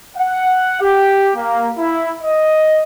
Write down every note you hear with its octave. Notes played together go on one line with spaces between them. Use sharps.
F#5
G4
A#3
E4
D#5